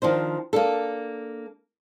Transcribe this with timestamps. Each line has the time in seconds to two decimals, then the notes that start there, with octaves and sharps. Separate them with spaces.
0.02 D#3 F3 D4 C5
0.53 A#3 D4 A4